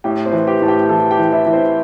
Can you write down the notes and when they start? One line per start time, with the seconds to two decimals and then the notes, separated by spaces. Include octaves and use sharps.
0.04 A2 G4 G5
0.25 C4 C5
0.33 E3
0.47 G4 G5
0.62 A2 A5
0.68 G4 G5
0.89 E3 A4 A5
1.11 G4 G5
1.18 E3
1.33 E4 E5
1.46 E3
1.53 C4 C5